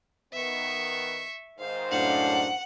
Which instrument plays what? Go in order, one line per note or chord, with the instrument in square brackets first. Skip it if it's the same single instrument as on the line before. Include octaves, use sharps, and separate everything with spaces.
[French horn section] D#3 B3 [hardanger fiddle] E5 C#6
[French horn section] G#2 D#3 C5 [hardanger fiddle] F5
[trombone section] F#2 A2 D4 [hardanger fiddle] F5 [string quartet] F#5